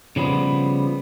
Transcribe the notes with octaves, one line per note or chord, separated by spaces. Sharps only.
C#3 F3 G3 B3